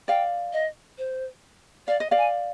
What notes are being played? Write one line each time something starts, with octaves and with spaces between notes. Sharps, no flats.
D5 F5 G5
D#5
C5
D5 F5
D#5
D5 F5
G#5